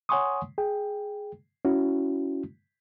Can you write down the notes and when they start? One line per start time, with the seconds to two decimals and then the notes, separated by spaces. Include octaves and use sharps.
0.09 C#5 F#5 G#5 C6 C#6 D#6
0.58 G#4 G5
1.65 C#4 E4 F#4